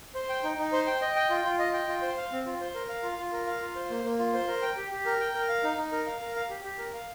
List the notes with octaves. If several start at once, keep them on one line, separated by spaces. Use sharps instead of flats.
C5
G5
D#4
D#4
C5
G5
D#5
G5
F4
F4
D#5
G5
F4
C5
F5
C4
F4
C5
A#4
F5
F4
F4
A#4
F5
F4
C5
A#3
A#3
F4
C5
A#4
G5
G4
G4
A#4
G5
A#4
F5
D#4
D#4
A#4
F5
A#4
F5
G4
G4
A#4
F5